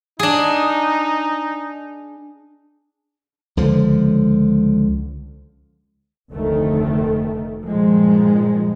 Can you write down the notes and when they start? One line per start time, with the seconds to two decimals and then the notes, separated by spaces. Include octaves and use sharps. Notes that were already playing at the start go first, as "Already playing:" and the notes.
0.19 D4 D#4 G#4
3.57 C#2 D3 F3
6.31 F1 D2 D#3 A3
7.65 G2 A#2 D#3 F3 G#3